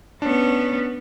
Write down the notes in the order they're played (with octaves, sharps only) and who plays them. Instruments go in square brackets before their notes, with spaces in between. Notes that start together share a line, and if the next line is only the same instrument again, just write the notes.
[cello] B3 C#4 [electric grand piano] D4